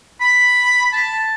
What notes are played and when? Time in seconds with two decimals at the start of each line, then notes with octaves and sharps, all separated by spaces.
0.21 B5
0.93 A5